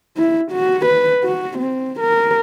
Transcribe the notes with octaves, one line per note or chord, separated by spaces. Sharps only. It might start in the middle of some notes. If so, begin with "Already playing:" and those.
E4
F#4
B4
F#4
C4
A#4